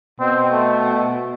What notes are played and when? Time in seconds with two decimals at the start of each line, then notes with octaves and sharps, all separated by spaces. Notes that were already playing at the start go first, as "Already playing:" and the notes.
0.20 B2 C4
0.50 A3